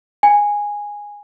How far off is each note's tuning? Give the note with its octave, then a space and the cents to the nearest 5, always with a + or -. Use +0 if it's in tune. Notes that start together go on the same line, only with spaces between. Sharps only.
G#5 -10